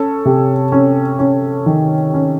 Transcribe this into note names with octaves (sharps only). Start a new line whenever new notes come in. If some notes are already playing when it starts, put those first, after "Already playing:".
Already playing: C#4 A4
C3
C#4
C#4
D#3
C#4